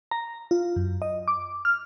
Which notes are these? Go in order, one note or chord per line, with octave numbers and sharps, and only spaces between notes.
A#5
F4
F#2
D#5
D6
F6